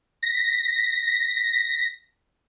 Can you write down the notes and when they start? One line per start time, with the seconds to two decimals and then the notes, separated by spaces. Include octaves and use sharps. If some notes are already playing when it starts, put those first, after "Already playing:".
0.23 A#6 B6